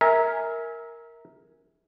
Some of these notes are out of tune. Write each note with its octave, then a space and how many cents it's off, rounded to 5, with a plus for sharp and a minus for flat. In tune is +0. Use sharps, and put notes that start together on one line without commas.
A#4 +0 E5 -25 G#5 +0